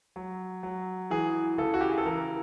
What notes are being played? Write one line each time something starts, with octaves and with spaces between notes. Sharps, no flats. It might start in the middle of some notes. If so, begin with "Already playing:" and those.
F#3
F#3
E3 G#4
C#3 A4
F#4
G4
G#4
A4
E3 A#4